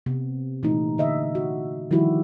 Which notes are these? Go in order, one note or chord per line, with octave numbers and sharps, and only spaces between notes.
C3 B3
A#2 E3 A3 D#4
D3 D#5 E5
F#4
D#3 F3 G3 E4 F#4 G4